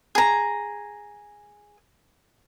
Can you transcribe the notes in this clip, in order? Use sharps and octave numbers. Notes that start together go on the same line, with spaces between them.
G#4 A#5